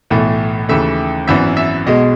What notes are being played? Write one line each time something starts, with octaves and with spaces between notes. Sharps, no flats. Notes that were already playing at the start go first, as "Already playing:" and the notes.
B1 A2 E3 A3
D#2 C#3 E3 A3 E5
G#1 F#2 E3 B3 E5
E5
B1 B2 G#3 D#5